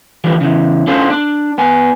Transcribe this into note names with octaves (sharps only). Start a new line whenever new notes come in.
D3 E3 F3 G3
C#3 E3
C#4 D4 F4 A4 C5
D4
B3 G#5